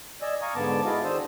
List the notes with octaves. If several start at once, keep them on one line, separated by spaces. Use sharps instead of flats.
D5 D#5 G#5 E6
F5 G#5 A#5 C#6 D#6
G#2 D3 B3 A5 D6
E4 F#4 G#4 D#5 F5
D#3 D4 C5 D#6 E6